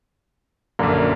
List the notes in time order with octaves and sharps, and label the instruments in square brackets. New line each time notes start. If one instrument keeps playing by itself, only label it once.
[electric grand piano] A#1 F#2 [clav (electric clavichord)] D3 A#3